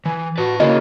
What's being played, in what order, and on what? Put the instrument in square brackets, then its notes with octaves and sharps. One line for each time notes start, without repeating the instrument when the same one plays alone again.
[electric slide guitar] E3 [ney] G#5
[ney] F#4 [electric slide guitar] B4 A5
[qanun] C#3 A#3 [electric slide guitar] E4 F#4 [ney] G#4 [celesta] D#5